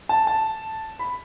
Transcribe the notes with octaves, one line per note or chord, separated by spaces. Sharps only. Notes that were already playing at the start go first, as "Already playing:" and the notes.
A5
A5
B5